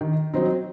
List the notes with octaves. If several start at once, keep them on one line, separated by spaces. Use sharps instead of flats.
D#3
F#3 C4 D#4